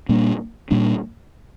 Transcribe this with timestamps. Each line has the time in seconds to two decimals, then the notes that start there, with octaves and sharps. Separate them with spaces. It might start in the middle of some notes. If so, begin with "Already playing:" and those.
0.09 A#2 G3 A#3 D4
0.71 A#2 G3 A#3 D4